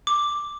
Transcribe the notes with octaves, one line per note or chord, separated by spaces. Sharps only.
D6